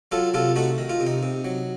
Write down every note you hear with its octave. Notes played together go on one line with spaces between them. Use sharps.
F#3 F4 A4
C3 F4 A4
A3 D#4 F#4
D#3
F4
C3
D#4
C3
F#3